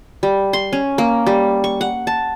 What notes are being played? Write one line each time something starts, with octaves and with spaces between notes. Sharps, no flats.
G3
C6
C#4
A#3
G3
C#6
F#5
A5